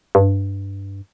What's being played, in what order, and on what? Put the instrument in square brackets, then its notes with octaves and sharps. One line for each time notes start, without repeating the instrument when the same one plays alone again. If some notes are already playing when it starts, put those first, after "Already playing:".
[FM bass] G2